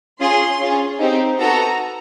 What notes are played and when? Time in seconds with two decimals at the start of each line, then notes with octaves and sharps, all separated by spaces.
0.19 C#4 F4 G#4 C6
0.60 C#4 F4 G#4
1.00 C4 D#4 G4
1.39 B3 D#4 F#4 A4 A#5